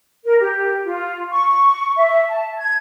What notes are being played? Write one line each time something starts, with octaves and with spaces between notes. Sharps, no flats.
A#4
G4
F4
C#6
E5
A5
G#6